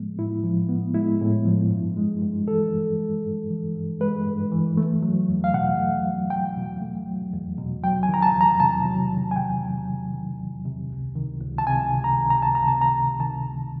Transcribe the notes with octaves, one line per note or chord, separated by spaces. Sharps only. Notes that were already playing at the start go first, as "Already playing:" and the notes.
Already playing: A2 F3 G#3 B3
A2 E4
F3
B3
G#3 E4
A2
F3
G2
G#3
G2
E3 A4
G2
G#3
G2
E3
G2
G#3 B4
G2
E3
A3
F#3
E2
F5
B2 F#5
A3
F#3
E2 G5
B2
A3
F#3
E2
B2
F#3 G5
G#5
D#3
A#5
A5
E2
A#5
C3 A5
F#3
D#3
G#5
E2 G5
C3
F#3
D#3
E2
C3
C#2
D#3
C#2
A5
C3 G#5
C#2
A#5
D#3
A#5
C#2 A5
A#5
C3 A5
A#5
C#2
D#3 A5
C#2